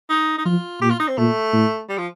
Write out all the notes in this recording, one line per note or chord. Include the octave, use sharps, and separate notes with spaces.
D#4
D#4
F3 F4
A#2 G4
F4
D#4
C4
A#2 A3
A2
G3
F3